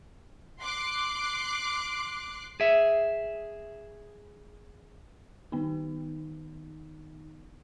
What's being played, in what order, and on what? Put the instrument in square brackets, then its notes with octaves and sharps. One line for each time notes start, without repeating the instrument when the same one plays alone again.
[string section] C6 D6 F#6 C7
[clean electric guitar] G#4 E5
[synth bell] D#3 B3 D#4